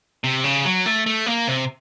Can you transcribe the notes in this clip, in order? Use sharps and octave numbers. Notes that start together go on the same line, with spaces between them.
C3
C#3
F#3
A3
A3
A#3
C3